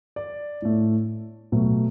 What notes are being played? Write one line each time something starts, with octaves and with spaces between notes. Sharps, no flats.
D5
A2 A3
B2 F#3 A3